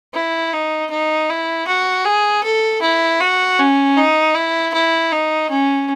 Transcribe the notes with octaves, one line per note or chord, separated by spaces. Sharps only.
E4
D#4
D#4
E4
F#4
G#4
A4
E4
F#4
C#4
D#4
E4
E4
D#4
C#4